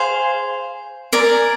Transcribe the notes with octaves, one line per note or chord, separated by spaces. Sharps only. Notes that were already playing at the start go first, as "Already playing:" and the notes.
Already playing: G#4 C5 F5
A#4 D5 G#5